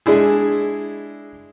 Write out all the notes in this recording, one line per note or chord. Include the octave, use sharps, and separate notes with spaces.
G#3 D4 E4 G#4